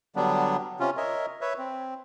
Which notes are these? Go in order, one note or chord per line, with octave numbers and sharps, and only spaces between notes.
D3 F#3 G3 B3 D4
C3 C#4 F4
A#4 C#5 D#5 E5
B4 C#5 E5
C4